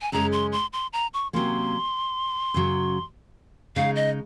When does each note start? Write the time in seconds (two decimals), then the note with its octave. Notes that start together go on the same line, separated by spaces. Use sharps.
0.02 G#5
0.12 F#2 C#3 G#3 C#4 A#5
0.32 C6
0.52 C6
0.73 C6
0.93 A#5
1.14 C#6
1.33 C3 F#3 A#3 C#4 C6
2.54 F#2 C#3 F#3
3.76 C#3 G#3 D#4 F5
3.96 D#5